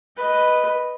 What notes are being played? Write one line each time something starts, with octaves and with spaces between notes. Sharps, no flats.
B4 D#5